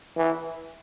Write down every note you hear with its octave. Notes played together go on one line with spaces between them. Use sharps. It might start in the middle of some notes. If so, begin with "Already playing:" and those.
E3